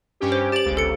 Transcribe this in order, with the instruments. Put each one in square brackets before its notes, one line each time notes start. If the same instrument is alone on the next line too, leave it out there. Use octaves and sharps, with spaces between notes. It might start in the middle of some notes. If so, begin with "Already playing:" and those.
[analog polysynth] G2 C#4 G4
[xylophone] C5
[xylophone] G4 F#7 [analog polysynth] A6 D7
[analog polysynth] G1 C#2
[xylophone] A4 C#7